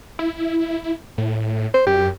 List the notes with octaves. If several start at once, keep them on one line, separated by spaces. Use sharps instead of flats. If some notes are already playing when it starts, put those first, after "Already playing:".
E4
A2
C5
F#2 G4